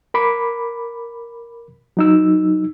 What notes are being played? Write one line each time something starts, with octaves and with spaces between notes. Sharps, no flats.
A#4 B5 D6
F#3 D#4 E6